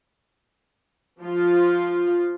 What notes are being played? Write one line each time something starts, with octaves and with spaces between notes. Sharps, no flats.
F3 F4